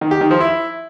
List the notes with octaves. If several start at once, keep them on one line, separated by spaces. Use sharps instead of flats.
D#3
G4
D#3
F3
E4